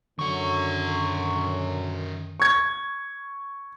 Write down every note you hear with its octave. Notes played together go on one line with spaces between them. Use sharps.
F#2 D3 D#3 F#3 F#5 C#6
C#6 G#6